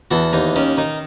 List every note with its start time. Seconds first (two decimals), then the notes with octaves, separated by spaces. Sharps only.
0.11 E2 F#4 A4
0.33 D#2 D#4
0.56 D#3 C#4
0.77 D#3 D#4